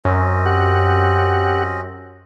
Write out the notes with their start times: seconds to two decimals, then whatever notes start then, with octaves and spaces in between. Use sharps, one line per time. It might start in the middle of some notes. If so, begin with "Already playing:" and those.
0.05 F#2 C4 C#4 D#5
0.46 G4 F#5